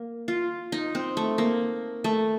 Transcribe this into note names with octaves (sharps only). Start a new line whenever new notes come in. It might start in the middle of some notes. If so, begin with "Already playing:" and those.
Already playing: A#3
F4
D#4
C4
A3
A#3
A3